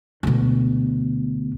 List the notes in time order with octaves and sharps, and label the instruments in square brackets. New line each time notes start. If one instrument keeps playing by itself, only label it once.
[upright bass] D2 B2